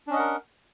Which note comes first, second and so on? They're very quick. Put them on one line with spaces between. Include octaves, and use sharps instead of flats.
D4 C#4 D#5 F#5 A#4